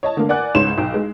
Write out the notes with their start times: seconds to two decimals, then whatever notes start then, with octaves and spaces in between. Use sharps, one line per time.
0.03 C#5 D#5 A5
0.17 D3 A#3
0.29 A#4 D5 F#5 G#5 F#6
0.55 C#2 G#2 C#5 C6 E7
0.78 B1 G5
0.94 G#3